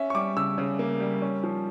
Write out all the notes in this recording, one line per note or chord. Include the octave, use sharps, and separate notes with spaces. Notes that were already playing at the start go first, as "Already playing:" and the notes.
Already playing: C#4 E5
C#6
G3 D6
C#3 E6
C#3
A#3
G3
C#4
F3